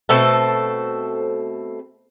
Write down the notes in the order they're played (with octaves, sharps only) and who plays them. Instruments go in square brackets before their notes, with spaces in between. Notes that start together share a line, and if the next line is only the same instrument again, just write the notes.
[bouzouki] B2 A3 C4 A4